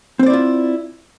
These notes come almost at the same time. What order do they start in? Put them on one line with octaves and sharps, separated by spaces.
C4 C5 D5 E4 F4